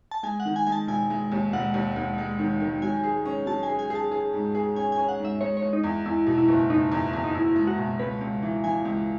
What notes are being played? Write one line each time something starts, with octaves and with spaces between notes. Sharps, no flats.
A5
G#3 G#5
F#5
D#3
G#5
G#3 G#5
A5
E1 G#5
G#3
D#2
E1 F#5
D#2
D#2
G#3
D#3
D#3
F#3 G#5
G#4
C#4
F#3 A5
G#5
G#4
G#5
G#4 A5
G#4
G#2
G#4
C#4 G#5
G#5
C#4
F#5
G#2 E5
G#3 C#5
C#5
G#3
D#4
E2
E2 E4
B2
E4
F#1
F#1 D#4
E2
E2
D#4
E2 E4
G#3
F#4
B2
C#2 B4
C#2
E3
E3 G#5
C#2